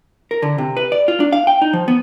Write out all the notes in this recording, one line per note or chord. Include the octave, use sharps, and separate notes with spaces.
A#4
D3
C3
B4
D5
F4
D4
F5
G5
D#4
F3
B3